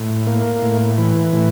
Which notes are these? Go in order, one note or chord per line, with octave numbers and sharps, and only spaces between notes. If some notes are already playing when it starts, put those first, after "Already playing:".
Already playing: A2
A#3
A2
E3
A2